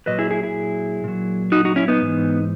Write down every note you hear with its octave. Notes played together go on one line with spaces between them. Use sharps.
A#2 F#3 B4 D#5
E4 G#4
E4 G#4
E4 G#4
A#2 F#3
D#4 F#4
D#4 F#4
C#4 E4
B3 D#4
G#2 E3